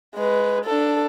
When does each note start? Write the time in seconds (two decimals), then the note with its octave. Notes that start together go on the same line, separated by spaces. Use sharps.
0.15 G#3 B4
0.65 D4 A4